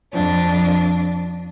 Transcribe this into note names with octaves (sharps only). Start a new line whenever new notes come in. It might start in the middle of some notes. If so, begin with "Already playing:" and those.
F2 D4